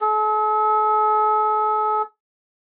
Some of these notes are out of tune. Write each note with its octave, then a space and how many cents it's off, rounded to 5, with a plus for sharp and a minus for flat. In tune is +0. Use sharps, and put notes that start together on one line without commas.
A4 -45